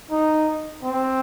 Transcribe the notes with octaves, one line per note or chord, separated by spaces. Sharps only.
D#4
C4